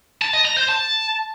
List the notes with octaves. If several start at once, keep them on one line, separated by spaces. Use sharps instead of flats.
A5
D#5
A#5
C5
A5